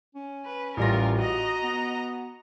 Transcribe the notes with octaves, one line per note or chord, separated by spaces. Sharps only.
C#4
B4
A1 G3 F4 A#4 A#6
F#4 D#5 A#5
B3